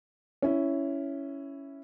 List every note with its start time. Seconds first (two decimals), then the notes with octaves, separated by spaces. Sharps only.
0.42 C#4 E4